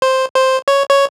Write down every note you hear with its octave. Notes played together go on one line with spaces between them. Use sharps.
C5
C5
C#5
C#5